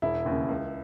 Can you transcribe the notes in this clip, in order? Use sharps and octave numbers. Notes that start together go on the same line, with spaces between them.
E1 E4
D#2 C#3
C#2